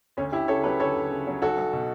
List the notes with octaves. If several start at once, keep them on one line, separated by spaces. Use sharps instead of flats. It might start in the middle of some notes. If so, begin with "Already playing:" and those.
D2 C#4
D2 E4 G4
C#3 A4 C#5
F#3 G4 B4
D2 A4 C#5
D2
C#3
F#3
B1 F#4 A4
B1
B2